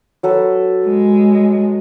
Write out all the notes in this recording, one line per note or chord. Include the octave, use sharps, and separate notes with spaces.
F#3 A4 B4
G#3